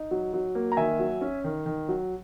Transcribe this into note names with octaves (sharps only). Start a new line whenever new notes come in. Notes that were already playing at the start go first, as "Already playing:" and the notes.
Already playing: D#4
F#3
F#3
A#3
A#5
D#3 E5 G#5
F#3
C#4
D#3
D#3
F#3